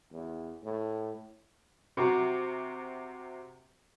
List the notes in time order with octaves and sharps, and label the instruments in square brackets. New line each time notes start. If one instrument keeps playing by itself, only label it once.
[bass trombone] E2
A2
[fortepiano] C3 F#4 A#5